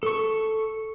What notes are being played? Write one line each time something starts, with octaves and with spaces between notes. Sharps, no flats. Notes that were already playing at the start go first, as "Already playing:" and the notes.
A4 C#6